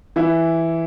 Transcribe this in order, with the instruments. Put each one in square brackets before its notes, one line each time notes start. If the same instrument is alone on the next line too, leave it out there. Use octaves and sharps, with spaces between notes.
[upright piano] E3 E4